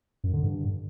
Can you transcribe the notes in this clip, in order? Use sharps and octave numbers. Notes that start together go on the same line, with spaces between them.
F#2
D3
G2